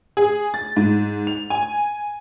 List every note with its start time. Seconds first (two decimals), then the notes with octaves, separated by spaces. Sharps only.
0.17 G#4
0.54 A6
0.77 G#2
1.27 F7
1.50 G#5